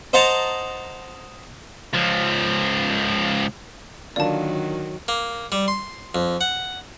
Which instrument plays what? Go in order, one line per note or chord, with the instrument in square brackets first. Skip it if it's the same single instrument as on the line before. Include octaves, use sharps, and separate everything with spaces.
[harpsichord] C5 D#5 F#5 A5 A#5
[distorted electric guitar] C#2 F3
[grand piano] D3 A#3 F4 [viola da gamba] D#3 F#3 [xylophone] D5 A5
[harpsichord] A#3
G3
C6
F2
F#5